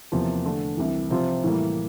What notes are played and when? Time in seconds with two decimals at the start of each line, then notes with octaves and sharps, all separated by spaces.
0.12 E2 C3 F3 A#3
0.45 D3 A3 D4
0.77 C2 C3 E3
1.10 C3 F3 C4 F4 C5
1.44 A2 E3 G3 A#3